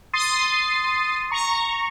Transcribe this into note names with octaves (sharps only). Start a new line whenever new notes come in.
C6 D#6 A6 C7 D#7
A#5 C#6